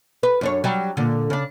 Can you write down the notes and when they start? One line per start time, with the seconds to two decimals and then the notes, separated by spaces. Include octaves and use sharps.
0.23 B4
0.41 F#2 D4 C#5
0.64 F#3 G3
0.97 A#2 D3
1.30 C#3 D4